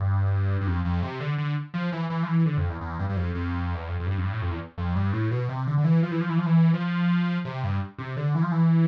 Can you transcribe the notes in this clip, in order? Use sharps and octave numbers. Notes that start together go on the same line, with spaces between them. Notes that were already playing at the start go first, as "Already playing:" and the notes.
Already playing: G2
G2
F2
F2
C3
D3
D3
F3
E3
E3
F3
E3
D3
F2
E2
E2
G2
G2
F2
F2
E2
F2
F2
G2
F2
G2
A2
F2
E2
F2
G2
A2
B2
C3
D3
D3
E3
F3
E3
F3
E3
F3
E3
F3
C3
G2
C3
D3
E3
F3
E3